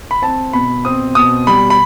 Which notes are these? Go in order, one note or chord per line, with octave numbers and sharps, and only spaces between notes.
B5
C4 A5
B2 B5
C4 D#6
B2 D#6
G3 B5
B5